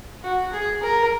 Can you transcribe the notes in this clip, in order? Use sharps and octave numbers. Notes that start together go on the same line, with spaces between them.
F#4
G#4
A#4